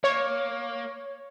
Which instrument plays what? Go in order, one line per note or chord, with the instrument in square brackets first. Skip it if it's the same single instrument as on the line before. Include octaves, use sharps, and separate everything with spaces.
[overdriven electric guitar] A#3 [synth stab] C#5